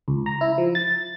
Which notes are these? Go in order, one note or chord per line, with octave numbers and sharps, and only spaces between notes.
C#2
A#5
E4
F3
A6